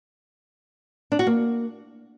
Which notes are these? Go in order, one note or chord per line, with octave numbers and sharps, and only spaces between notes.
D4
F#4
A#3